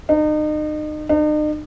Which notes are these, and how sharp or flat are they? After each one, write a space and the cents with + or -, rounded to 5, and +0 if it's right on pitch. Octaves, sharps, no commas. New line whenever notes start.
D#4 -35
D#4 -45